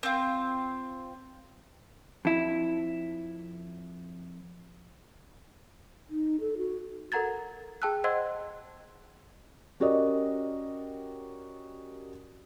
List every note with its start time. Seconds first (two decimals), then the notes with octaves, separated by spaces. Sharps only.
0.03 C4 F4
2.25 F2 E4
6.10 D#4
6.40 A4
6.57 F#4
7.12 A4 A#4 F#5 A#5 G#6 A6
7.82 G#4 G5 A5 E6 F#6
8.04 C5 D#5 F#5 C6 E6 G#6
9.80 C#4 F#4 G4 A#4 D5 D#5